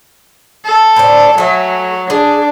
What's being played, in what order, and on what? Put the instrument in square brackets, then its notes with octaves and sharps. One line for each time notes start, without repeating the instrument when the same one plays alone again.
[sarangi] A4
[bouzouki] A2 C4 D5
[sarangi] F#3 [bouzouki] A3 G#5
[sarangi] D4 [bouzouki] G#4